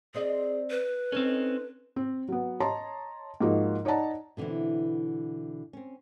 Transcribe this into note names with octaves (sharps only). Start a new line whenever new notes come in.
C4 G#4 D5 D#5
B4
C4 C#4 D#4 A4
C4
F#3 B3
C#5 D#5 A5 A#5 C6
G#2 F3 A#3 D#4 F#4
D#4 C#5 D5 F#5 A5 A#5
B2 D3 E3 C4 E4
C4 C#4